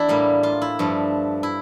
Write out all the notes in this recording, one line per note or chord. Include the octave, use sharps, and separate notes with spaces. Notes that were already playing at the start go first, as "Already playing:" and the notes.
Already playing: E2 D4 E4
A2 G3 A#3
F4
E4
G2 F3 A3
E4